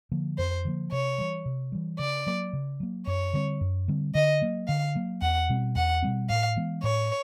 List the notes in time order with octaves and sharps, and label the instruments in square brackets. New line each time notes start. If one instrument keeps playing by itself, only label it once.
[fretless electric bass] D3 F3 A#3
[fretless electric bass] F2 [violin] C5
[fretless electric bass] D3 F3 A#3
[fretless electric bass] C3 [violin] C#5
[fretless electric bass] E3 G3
C3
E3 G3
[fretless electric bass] C#3 [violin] D5
[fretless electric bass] F#3 A#3
C#3
F#3 A#3
[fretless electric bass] F#2 [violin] C#5
[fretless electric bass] D3 G3 C4
F#2
D3 G3 C4
[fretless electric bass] D3 [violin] D#5
[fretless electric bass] F#3 A#3
[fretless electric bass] D3 [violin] F5
[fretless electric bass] F#3 A#3
[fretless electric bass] E2 [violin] F#5
[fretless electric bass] B2 G3 C4
[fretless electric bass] E2 [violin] F#5
[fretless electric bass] B2 G3 C4
[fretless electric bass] A2 [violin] F5
[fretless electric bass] E3 G#3 B3
[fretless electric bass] A2 [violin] C#5